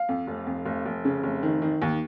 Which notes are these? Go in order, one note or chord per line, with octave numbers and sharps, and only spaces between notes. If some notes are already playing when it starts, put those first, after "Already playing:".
Already playing: F5
F2
F1
F2
F1
F1
C#3
F1
D#3
D#3
D#2